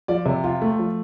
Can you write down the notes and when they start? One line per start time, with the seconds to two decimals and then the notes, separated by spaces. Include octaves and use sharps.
0.08 F3 D5
0.26 C3
0.44 F4
0.62 A3
0.79 F3